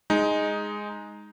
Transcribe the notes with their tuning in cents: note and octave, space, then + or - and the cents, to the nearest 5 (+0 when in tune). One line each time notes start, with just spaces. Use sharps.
G#3 +0 D#4 +0